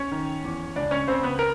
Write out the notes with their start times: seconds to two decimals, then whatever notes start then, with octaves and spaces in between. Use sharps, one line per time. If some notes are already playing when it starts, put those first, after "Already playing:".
Already playing: C#4 C#5
0.12 D#3
0.45 E2
0.76 C#2 D4 D5
0.91 C#4 C#5
1.08 C#3 C4 C5
1.23 B3 B4
1.39 A#4